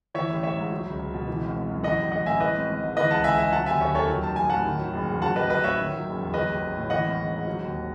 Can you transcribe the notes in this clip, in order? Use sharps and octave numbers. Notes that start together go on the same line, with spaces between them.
E3 C#5 E5
A1
A1 C#5 E5
G#2
F#3
C#2
C#2
B2
E3
G#1
G#1
F#2
E3 D#5 F#5
A1
A1 D#5 F#5
A2 E5 G#5
E3 B4 D#5
G#1
G#1
G#2
E3 B4 D#5
C#2 F#5 A5
C#2 E5 G#5
C#3 E5 G#5
F#3 F#5 A5
D#2 E5 G#5
D#2 C#5 E5
D#3 A4 C#5
F#3
A1 A5
A1 G#5
A2 F#5 A5
D#3
F#3
F#1
E2
F#3 F#5 A5
A1 B4 D#5
A1 B4 D#5
A2 C#5 E5
D#3
F#3
F#1
E2
F#3 B4 D#5
A1
A1
A2
E3 D#5 F#5
G#1
G#1
G#2
F#3
D#2